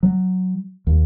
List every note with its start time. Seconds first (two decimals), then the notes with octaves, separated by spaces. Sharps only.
0.03 F#3
0.87 D#2